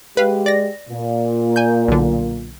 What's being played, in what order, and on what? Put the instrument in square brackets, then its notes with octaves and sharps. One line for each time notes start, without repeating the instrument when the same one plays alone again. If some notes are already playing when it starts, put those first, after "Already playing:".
[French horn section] G#3 G4 [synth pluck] B4 F5
[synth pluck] D5 A#6
[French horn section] A#2
[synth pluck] G#5 G6
B1 D3